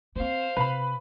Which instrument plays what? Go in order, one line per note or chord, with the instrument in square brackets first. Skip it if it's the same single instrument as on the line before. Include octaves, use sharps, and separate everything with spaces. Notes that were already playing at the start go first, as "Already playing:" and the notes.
[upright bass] B3 C4 [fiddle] C5 F5
[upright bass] C3 [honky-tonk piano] B4 B5